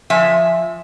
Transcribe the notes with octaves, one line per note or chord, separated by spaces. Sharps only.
F3 E5 G#5